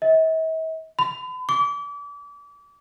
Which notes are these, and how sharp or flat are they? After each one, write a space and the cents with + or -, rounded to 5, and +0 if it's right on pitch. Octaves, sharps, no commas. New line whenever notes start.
E5 -45
B5 +40
D6 -35